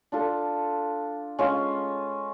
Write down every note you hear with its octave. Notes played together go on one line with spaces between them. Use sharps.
D4 F4 A4
G#3 C#4 F4